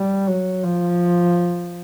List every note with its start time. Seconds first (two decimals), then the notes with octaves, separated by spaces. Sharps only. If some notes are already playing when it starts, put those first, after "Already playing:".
Already playing: G3
0.27 F#3
0.63 F3